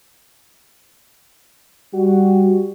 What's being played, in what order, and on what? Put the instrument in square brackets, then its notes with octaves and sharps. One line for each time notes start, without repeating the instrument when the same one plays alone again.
[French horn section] G3 F#4